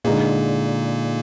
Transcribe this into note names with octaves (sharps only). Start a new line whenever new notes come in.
A#2 D3 G#3 A#3 D#4 G#4